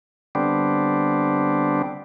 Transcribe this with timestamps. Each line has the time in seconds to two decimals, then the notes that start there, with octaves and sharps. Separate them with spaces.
0.35 D3 G3 B3 C4 D4